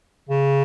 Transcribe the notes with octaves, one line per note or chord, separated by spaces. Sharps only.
C#3